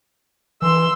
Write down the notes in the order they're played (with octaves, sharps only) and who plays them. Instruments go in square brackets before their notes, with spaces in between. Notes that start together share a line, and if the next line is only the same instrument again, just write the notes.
[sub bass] E3 [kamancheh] C6 E6